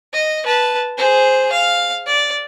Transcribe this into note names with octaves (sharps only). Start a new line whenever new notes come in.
D#5
B4 A5
G#4 C5
F5
D5